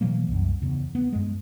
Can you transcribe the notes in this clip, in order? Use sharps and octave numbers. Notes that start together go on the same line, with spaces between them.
B2 E3 F#3 A#3
C2 F#2
E2 C#3
B3
G2 G#3